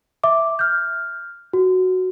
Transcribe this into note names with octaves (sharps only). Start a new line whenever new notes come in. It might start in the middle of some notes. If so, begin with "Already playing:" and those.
E5 D6
F6 G6
F#4